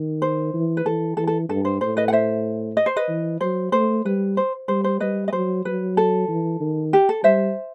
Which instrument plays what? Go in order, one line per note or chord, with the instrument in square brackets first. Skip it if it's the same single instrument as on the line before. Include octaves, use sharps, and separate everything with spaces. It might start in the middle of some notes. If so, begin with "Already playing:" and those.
Already playing: [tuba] D#3
[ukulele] C5
[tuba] E3
[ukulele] B4
[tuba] E3 [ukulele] A4
[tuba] E3 [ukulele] A4
[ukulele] A4
[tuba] G2 [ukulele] A4
[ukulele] C5
[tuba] A2 [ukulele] C5
[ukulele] B4 D#5
F#5
C5 E5
D#5
C5
B4 D#5
[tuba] E3
[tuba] F#3 [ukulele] C5
[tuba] A3 [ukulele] C5
[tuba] G3 [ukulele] B4
[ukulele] C5
[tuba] G3 [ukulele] C5
[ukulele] C5
[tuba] G3 [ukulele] B4 D#5
[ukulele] D#5
[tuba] F#3 [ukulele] C5
[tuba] F#3 [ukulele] B4
[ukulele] A4
[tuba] E3
D#3
[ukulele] G4
A4
[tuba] G3 [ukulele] C5 E5